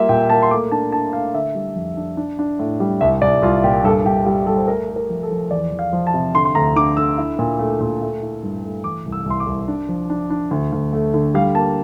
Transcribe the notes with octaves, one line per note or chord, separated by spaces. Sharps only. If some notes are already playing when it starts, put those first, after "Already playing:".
Already playing: G3 A#3 F4 E5
A#2 G5
A#3 A5
C6
A3 D6
D4 A5
D4 A5
A3 F5
D3 E5
G3
F2
D4
D4
D4
A2
G3
C2 E5
C2 D5
C2 F4
A#2 G4
G2 A4
G2 G4
G3 G4
G3 A4
C5
A3 A#4
A3
A#4
F3
A4
F3
E2 D5
E2
F5
F3
A5
C3
D3 C6
C6
D2 A#5
D3 D6
D3 E6
E4
A#2
A3
A#2
A3
E4
G2
A3
E3 D6
C2
E6
C2 C6
D6
C2
D4
F3
D4
D4
D2
D2
A3
D3
G3 F5
A#3 A5